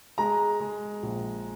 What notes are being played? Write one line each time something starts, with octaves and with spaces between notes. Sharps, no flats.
G#3 A#5
G#3
A#1